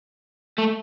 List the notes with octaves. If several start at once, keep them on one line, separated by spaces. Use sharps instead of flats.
A3